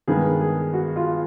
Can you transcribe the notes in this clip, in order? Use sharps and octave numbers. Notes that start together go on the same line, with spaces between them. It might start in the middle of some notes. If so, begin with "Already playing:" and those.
G2 D#3 G#3 B3 G#4
G#4
F#4
F4